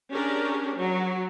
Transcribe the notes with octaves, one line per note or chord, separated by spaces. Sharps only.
C#4 D4 G4 G#4 A#4
F#3